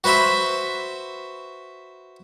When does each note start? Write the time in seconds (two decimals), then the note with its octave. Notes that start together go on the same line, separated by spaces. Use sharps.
0.04 F#4 B4 C5 E5 B5